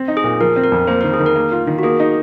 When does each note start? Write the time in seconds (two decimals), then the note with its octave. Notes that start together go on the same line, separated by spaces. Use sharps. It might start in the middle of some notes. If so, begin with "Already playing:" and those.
Already playing: C4
0.08 D#4
0.17 G#4
0.24 A#2
0.40 F3 A#4
0.56 C4
0.64 A#4
0.72 F2
0.87 A#3 C5
1.01 D#3 A#4
1.14 G#4
1.20 D#3
1.26 A#4
1.36 A#3
1.52 F4
1.67 D#3
1.79 F#4
1.83 A#3 G#4
2.00 D#4